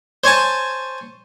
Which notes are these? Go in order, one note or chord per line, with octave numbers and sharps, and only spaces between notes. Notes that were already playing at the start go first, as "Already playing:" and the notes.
C5 C#5 G#5 A5